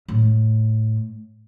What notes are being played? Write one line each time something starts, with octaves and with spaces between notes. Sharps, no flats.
A2